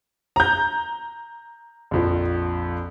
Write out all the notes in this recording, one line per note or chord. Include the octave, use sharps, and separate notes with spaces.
A#5 G6
A#1 F2 F3